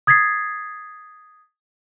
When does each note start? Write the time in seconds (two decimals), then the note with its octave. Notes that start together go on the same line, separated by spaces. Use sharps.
0.07 D#6 G#6 A6 B6 C7